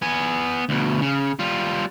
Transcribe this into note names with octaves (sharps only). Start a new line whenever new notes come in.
B3 G#5
D2 B2
C#3
G3 F4